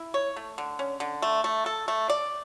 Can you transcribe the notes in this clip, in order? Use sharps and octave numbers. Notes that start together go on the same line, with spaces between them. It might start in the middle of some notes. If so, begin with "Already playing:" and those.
Already playing: E4
C#5
A3
D3
C#4
D3
A3
A3
A4
A3
D5